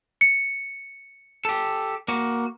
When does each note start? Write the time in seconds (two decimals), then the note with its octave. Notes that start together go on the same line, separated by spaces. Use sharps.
0.21 C#7
1.45 G4 A4
2.08 A#3 F#4